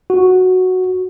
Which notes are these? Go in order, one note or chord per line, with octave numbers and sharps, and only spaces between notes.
F#4